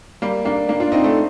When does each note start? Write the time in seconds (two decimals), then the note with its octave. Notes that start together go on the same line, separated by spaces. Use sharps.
0.22 G3 A#3
0.45 A#3 D4
0.69 A#3 D4
0.80 D4 F4
0.92 C4 D#4
1.03 A3 C4